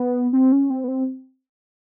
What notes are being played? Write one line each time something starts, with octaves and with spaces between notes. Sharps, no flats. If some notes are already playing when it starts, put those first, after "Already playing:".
Already playing: B3
C4
C#4
C4
B3
C4